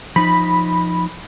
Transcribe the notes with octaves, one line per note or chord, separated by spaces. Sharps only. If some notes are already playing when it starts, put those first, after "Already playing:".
F3 D#4 B5